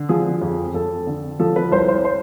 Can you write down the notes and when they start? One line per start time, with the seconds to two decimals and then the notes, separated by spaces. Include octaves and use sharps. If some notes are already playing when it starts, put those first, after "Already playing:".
Already playing: D3
0.09 F3 G#4
0.42 F2
0.74 F2 A4
1.07 D3
1.40 F3 A4
1.56 B4
1.72 C2 C5
1.88 C5
2.05 C5